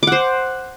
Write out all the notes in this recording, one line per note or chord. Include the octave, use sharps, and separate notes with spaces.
C5 F#5 D6